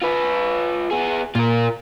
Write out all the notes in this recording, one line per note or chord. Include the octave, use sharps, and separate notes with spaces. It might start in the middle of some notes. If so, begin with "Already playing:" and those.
F4 B4
B3 G#4
A#2 F4 A#4